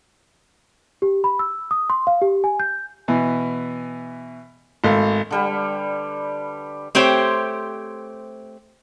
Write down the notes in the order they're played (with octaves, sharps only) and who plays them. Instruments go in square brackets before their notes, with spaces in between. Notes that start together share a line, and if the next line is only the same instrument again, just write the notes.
[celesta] G4
B5
E6
D#6
C6
F5
G4
G#5
G6
[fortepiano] B2 E3
G#1 A3 F5
[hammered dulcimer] D3 G3 B4
[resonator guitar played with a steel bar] A3 C4 G4 C5 C#5